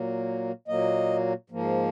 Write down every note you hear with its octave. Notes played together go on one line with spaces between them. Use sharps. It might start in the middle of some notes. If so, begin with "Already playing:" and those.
Already playing: A#2 F#3 A#3
A#2 F#3 A#3 D#5
G#2 F3 A#3